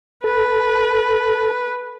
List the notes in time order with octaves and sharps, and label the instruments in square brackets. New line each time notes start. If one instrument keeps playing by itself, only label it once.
[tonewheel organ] A4 [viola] B4